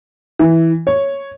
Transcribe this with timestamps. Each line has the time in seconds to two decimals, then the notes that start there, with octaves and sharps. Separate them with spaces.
0.39 E3
0.87 C#5